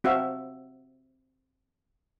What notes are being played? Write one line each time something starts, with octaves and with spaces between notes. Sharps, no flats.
C4 F#4 E5 F5